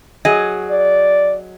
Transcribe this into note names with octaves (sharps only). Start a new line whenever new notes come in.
F#3 G#4 D#5
D5